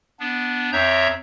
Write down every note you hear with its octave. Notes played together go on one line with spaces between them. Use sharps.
B3 D4
F2 C4 C#5 E5 A#5 G6